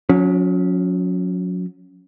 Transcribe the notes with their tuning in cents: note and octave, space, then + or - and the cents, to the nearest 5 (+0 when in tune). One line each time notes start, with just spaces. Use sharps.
F#3 -35 C#4 +15